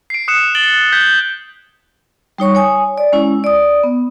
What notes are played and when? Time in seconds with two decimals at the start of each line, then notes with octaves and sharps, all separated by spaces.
0.10 C7 D7
0.28 D#6 F#6 C#7 E7
0.55 A6 D7 F#7 G7
0.93 G6 G#6 B6 G7
2.38 G3 D#4 C#5 C#6
2.55 C#5 G#5 D#6
2.98 D5
3.13 G#3 C#4 E4
3.44 D5 D#6
3.83 B3